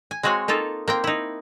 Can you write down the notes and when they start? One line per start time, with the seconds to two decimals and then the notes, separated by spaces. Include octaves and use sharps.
0.11 G#5
0.23 G#3 C4 F#4 C#5 G#5
0.48 A#3 D#4 F4 A4
0.88 A#3 C4 G5
1.04 D#4 E4